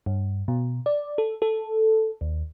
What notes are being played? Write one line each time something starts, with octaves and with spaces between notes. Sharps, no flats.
G2
B2
D5
A4
A4
D#2